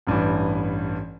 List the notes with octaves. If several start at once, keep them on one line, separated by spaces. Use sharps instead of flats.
A1 G2 E3